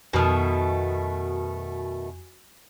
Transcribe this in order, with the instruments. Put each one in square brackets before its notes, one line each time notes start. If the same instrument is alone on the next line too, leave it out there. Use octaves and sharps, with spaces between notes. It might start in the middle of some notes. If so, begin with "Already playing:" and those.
[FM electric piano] F2 F#4 G#5 [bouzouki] B2 D#3 A3